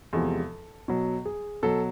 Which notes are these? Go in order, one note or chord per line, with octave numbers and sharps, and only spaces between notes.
E2 C3 F3 G#3 A4
B2 F#3
G#4
B2 F#3 A4